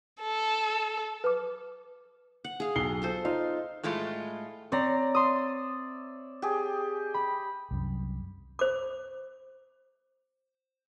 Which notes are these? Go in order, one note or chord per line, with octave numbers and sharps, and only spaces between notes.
A4
B4 D6
F#5
G#4 F5
B1 C7 G7
F4 A4 C5
D#4 F4 F5
A2 G#3 A3 F4
C4 C#5 D5 A#5
E5 C6 D#6
G4 G#4
B5
C2 F#2
C5 D6